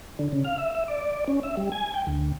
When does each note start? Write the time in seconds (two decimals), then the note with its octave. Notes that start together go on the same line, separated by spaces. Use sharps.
0.19 D3
0.32 C#3
0.45 F5
0.58 E5
0.75 E5
0.88 D5
1.28 C#4
1.43 E5
1.57 G3
1.72 G#5
1.94 G5
2.07 D2